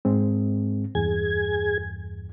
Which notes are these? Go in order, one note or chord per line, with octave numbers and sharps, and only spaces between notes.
G#2 G#3 C4
E2 G2 G#4 G#6